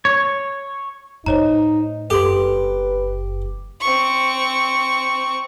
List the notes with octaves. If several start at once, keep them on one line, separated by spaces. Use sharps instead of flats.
C#5
A2 D#4 C5 C#5 A#5
F#1 G4 A4 B4 C6
C4 C#6